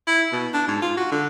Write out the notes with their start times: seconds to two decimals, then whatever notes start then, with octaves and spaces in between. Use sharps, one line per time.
0.07 E4
0.33 B2
0.53 D4
0.68 G#2
0.82 F4
0.97 F#4
1.12 D3